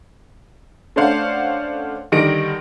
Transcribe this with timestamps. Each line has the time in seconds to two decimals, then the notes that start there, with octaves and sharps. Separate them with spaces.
0.96 A3 C#4 D4 C5 F5 F#5
2.12 D3 D#3 G3 D#4 A#6 D7